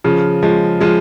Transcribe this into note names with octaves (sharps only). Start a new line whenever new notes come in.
C#3 F3
F3 G#3
F3 G#3